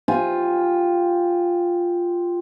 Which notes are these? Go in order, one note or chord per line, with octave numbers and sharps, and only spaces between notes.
F4 G4 G#5